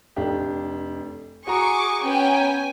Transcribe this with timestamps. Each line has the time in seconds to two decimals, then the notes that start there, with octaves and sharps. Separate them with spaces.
0.16 F1 D4 G4
1.47 F#4 G#4 A#5 C#6 D6
2.02 B3 C#4 G5 G#5